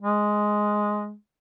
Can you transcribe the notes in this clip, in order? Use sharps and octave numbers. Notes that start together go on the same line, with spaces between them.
G#3